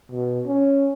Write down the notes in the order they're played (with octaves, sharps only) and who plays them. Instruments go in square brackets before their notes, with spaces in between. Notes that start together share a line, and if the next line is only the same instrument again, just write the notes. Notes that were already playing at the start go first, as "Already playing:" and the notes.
[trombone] B2
C#4